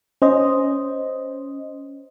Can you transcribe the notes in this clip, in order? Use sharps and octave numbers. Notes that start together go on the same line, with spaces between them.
C#4 C5 D#5